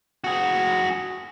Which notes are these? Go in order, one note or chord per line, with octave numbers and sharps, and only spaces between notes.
F#4 G#4